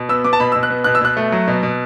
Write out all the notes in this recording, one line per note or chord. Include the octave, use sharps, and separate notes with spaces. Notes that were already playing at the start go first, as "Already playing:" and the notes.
Already playing: B2
B3 E6
B3 D6
A5
B2 B5
B2 E6
F#6
B3
B2 F#6
E6
B2 F#6
A3
F#3
B2
B2